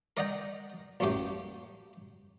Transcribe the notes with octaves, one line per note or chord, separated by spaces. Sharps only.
A#4 D5 D#5 F#5 G5 A#5
A1 F#2 A3 A#3 G4